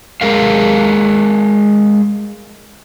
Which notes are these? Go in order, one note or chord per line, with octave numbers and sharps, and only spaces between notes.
G#3 G#4 A#4 F5